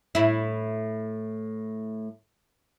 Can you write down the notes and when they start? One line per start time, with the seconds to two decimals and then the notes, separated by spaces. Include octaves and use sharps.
0.15 A2 E4